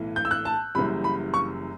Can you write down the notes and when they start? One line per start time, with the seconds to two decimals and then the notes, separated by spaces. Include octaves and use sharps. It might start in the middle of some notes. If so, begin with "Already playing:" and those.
Already playing: B1 A2 E3
0.16 G6
0.25 E6
0.31 F#6
0.45 A5
0.75 F#1 F#2 E3 G3 B5
1.04 B5
1.34 C#6